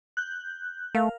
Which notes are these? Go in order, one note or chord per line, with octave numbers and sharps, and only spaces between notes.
F#6 G6
A3 A#4 F5